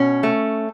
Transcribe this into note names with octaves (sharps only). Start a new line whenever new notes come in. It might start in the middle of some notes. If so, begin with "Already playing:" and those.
Already playing: B2 C#4
A3